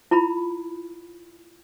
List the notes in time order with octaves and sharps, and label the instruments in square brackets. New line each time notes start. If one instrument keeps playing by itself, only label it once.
[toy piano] E4 F4 A#5 B5